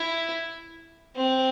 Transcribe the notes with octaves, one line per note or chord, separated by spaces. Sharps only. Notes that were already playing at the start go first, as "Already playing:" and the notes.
Already playing: E4
C4